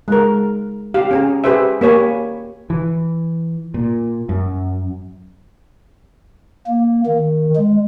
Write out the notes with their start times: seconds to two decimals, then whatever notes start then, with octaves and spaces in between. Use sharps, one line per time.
0.08 G#3 A#4
0.94 G4 F5
1.11 C#4 G#4 A#5
1.44 G4 G#4 B4 C5 E5
1.81 A#3 G4 C#5 G#5 B5
2.70 E3
3.74 A#2
4.29 F#2
6.67 A#3
7.06 D#3
7.56 G#3